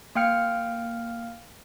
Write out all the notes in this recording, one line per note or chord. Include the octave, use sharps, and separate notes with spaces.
A#3 F5 G5 F6 C#7